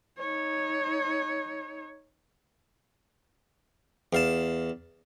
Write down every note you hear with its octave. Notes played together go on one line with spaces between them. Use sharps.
D#4 C#5
E2 F5 A5